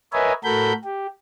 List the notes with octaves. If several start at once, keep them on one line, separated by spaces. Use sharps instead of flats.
A#4 B4 C#5 D#5 E5 G#5
A2 F#4 A4 A#4 B5 G6
G4